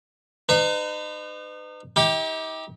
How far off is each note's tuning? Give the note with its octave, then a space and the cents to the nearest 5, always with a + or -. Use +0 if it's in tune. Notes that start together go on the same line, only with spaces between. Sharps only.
D#4 -35 B4 +40
D#4 +45 G4 +10